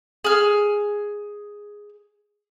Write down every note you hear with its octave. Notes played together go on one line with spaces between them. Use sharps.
G#4 F6